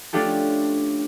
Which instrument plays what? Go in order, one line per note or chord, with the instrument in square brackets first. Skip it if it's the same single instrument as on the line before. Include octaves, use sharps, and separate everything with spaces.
[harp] A3 C#4 D4 F4 G4 A4